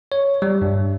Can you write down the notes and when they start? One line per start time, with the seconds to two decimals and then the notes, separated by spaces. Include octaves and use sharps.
0.12 C#5
0.42 G3
0.61 G2